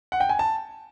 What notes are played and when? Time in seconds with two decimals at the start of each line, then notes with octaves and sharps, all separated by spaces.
0.12 F#5
0.20 G5
0.29 G#5
0.39 A5